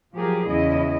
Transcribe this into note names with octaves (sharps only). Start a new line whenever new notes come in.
F3 F#3 G4 G#4 A#4
E2 C#3 E4 D#5